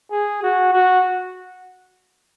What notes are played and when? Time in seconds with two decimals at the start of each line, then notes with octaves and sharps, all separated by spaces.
0.11 G#4
0.43 F#4
0.73 F#4